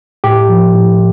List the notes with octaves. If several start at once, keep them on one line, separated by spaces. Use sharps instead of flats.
A2 G4
F3
A2